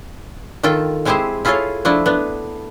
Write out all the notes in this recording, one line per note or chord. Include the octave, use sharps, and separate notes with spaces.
D#3 F4 A4 G5
G#3 C4 E4 G4 G#4 C5
E4 F4 G#4 A4 C#5 F5
F3 A3 D4 E4
B3 D4